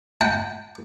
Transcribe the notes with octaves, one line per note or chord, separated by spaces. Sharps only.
F#5 G5